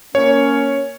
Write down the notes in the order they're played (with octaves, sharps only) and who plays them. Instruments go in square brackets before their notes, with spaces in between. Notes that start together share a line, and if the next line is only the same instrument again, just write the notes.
[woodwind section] A#3 C#4 [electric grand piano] C#5